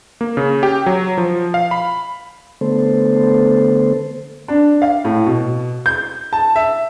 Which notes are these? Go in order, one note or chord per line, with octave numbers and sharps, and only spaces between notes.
A#3
C#3
G4
F#3
F3
F5
B5
D3 A3 B3 A4 C5
D4
F5
A2
B2
G6
A5
E5